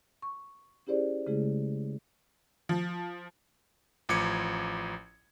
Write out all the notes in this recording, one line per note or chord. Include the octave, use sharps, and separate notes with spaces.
C#6
C#4 E4 G4 G#4 C5 D5
C#3 G#3 A3 E4 G#4
F3
A1 F3 D6 G#6 C#7